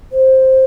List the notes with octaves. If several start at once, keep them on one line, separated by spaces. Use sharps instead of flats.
C5